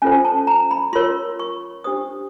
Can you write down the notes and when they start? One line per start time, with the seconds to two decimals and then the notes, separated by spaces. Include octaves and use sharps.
0.02 C#4 F4 A4 C5 G#5
0.25 A5
0.47 A#5
0.71 B5
0.93 F4 A#4 C#5 C6
1.39 C#6
1.84 D4 G4 C5 D#6